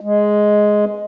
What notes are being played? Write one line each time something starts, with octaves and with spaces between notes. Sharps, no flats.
G#3